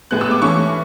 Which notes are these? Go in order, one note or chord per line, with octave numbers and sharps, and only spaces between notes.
A2 G#3 B3 F#6
E6
D6
E3 A3 C#4 C#6